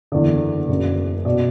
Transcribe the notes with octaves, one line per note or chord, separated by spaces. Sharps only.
F#1 E2 D3 D5
F#1 F#2 C#3
B2 D5